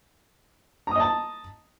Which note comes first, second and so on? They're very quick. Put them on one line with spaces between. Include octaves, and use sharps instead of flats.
A#5 D#6 D#5 A5